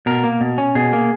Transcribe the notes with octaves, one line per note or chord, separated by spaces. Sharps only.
B2 A#4
A#3
B2
C#4
B2 G#4
A#3